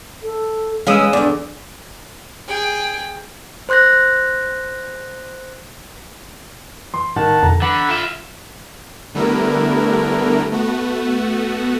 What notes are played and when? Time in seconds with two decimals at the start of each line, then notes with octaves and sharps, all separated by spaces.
0.22 A4
0.87 E3 G#3 C#4 G#4 F5 D#6 E6
1.13 E2 D3 D5
2.48 G#4 G5
3.69 C5 C6 F#6 G6 A#6
6.94 E3 C6
7.16 A2 D#3 F#5 A5 E7
7.42 F2 B2 D3 A#5
7.62 D3 E3 F#5 B5
7.90 F4 E5
9.15 D3 G3 A3 B3 E4 A#4
10.52 A3 B3 F#4